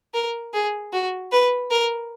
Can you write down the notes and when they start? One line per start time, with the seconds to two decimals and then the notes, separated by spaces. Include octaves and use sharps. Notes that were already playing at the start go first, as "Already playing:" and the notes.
0.14 A#4
0.54 G#4
0.93 F#4
1.32 B4
1.71 A#4